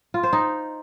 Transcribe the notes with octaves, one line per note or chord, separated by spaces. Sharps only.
F4
C5
D#4